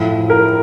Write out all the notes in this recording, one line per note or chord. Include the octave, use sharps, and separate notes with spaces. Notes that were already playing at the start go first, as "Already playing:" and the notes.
Already playing: A2 F3
A#4